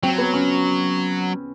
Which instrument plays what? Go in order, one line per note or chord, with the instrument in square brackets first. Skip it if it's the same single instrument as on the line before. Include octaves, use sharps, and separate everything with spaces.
[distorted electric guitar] F#3 [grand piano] C4
[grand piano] B3
C#4